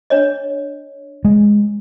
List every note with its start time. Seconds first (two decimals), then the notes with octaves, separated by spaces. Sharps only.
0.10 D4 C#5 D#5
1.25 G#3